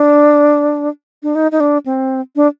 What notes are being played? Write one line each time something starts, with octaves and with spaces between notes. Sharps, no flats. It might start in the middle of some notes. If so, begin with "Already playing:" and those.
Already playing: D4
D4
D#4
D#4
D4
C4
D4